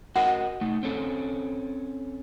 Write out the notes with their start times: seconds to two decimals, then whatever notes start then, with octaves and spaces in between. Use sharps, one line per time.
0.16 F#4 A#4 D#5 F#5
0.61 A3 D#4
0.83 C4 C#4 A4